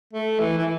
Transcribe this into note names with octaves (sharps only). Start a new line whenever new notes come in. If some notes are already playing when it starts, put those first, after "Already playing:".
A3
E3
E3